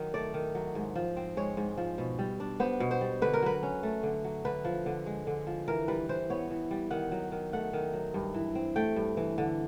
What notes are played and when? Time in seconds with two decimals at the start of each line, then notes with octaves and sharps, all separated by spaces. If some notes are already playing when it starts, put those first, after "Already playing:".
Already playing: D#3 F#3
0.14 A3 D5
0.34 D#3
0.55 F#3
0.75 G#2
0.95 F3
1.17 C4
1.37 G#3 C#5
1.57 G#2
1.77 F3
1.98 B2
2.19 G3
2.40 D4
2.60 B3 C5
2.80 B2
2.91 C5
3.01 G3
3.22 D3 B4
3.33 A#4
3.42 F#3 B4
3.63 C#4
3.83 A3
4.03 D3
4.24 F#3
4.45 D3 B4
4.65 F3
4.86 D3
5.06 G#3
5.27 D3
5.47 F3
5.68 E3 A#4
5.88 G3 B4
6.09 E3 C5
6.30 B3 C#5
6.51 E3
6.71 G3
6.91 D#3 F#5
7.12 F#3
7.32 D#3
7.53 A3 F#5
7.73 D#3
7.93 F#3
8.14 G2
8.34 E3
8.55 C4
8.76 A3 G5
8.96 G2
9.17 E3
9.38 D3